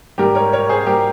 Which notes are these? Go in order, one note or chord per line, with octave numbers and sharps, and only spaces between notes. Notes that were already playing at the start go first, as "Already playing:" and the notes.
G#2 G3 G4 A#4
A#4 C#5
A#4 C#5
G#4 C5
G3 G4 A#4